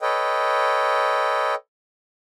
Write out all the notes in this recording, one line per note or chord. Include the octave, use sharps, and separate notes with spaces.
A4 B4 C#5 D#5 G5